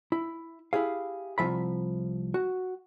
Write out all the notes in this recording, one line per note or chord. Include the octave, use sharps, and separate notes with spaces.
E4
E4 G4 G#4 F5
C2 F#2 F3 E5 B5
F#4